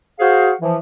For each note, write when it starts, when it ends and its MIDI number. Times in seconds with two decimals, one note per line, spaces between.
0.19 0.51 66
0.19 0.51 68
0.19 0.51 72
0.19 0.51 77
0.61 0.77 52
0.61 0.77 53